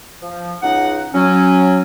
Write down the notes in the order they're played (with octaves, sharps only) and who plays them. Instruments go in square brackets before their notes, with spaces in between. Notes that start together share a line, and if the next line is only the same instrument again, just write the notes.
[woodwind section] F3
C#2 D#4 F#5
F#3 C#4